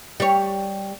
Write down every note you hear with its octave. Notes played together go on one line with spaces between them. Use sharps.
G3 C#5